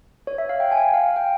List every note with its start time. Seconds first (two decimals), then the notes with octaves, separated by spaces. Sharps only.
0.27 C#5
0.38 E5
0.49 F5
0.60 G5
0.72 G#5
0.93 F5
1.16 G5